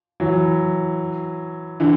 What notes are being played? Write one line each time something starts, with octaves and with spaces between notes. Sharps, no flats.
E3 F#3
D3 E3